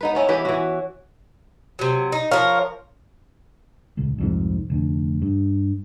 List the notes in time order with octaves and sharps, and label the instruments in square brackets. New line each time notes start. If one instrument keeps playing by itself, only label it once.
[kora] B3 D#4 B4
B3 C#4 E4
E3 C#4 G4 B4
E3 F#4
[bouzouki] C3 F#3
D#4
[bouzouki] F3 A#4 [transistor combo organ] C#5 F5
[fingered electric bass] D#1 C#2
C2 F2 G#2
F1 D2
G2